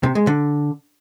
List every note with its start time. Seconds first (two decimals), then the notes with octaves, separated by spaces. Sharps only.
0.03 C3
0.15 G#3
0.27 D3